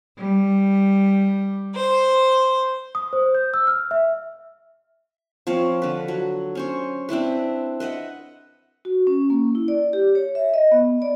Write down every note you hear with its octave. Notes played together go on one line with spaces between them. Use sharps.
G3
C5
D#6
C5
G6
E6
F6
E5
F3 C4 C#5 F5
D3 B4
F#3
C#4 C5 C#5
C4 D4 E4 B4
B4 D#5 E5 F#5
F#4
C#4
A#3
E4
D5
G4
C#5
E5
D#5
B3
D5